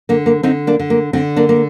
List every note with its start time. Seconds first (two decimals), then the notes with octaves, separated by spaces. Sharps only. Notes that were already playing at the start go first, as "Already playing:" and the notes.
0.09 D3 A#3
0.26 A#3
0.43 D3 C4 D#4
0.67 A#3 D4
0.79 D3
0.90 A#3
1.13 D3 C4
1.36 A#3 D4
1.49 A#3